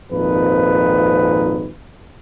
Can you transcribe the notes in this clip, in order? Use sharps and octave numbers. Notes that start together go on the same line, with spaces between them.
G#1 F2 A#2 F3 D#4 B4